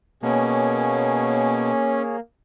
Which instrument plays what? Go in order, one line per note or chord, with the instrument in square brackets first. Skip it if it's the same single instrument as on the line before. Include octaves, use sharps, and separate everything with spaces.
[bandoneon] B2 [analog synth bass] A#3 [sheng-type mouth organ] C#4 [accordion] G#4 C#5